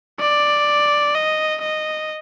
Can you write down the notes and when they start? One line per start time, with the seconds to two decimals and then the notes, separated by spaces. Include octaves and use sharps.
0.19 D5
1.14 D#5
1.61 D#5